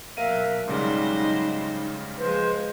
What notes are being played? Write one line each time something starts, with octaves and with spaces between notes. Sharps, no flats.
B2 F#3 A#4 E5 F5 D#7
G#2 C#3 F#3 G3 D#4 C5 D#5
F3 G#3 B4 C5